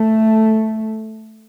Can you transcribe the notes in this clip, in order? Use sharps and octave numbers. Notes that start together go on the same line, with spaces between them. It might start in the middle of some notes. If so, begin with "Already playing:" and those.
Already playing: A3